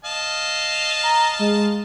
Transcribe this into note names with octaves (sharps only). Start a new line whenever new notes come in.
D#5 F5 A5
A#5
G#3